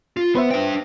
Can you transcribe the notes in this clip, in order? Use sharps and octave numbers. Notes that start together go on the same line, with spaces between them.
F4
B3 B4 C5 E5
D4 G5